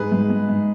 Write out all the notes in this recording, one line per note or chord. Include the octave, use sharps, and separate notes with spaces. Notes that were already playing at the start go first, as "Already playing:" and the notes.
Already playing: G#2 G#4 B4
G#2
G#2
G#2